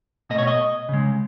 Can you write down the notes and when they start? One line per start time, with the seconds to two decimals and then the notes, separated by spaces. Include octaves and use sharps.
0.30 B2 A3 D#5
0.38 C#5
0.47 D#5
0.89 C#3 G#3